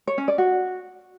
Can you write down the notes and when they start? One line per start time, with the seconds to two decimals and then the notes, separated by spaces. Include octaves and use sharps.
0.07 C#5
0.18 C#4
0.28 D5
0.38 F#4